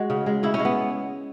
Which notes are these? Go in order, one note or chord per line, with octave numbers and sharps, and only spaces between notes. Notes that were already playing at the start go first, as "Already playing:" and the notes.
Already playing: G#3 F#4
C#3
G#3
C#3 E4
C#4
G#3
B3